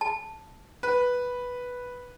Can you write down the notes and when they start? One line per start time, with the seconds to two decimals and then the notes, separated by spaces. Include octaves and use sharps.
0.01 A5
0.83 B4